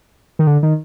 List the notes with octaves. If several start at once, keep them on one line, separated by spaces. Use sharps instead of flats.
D#3
D3
D#3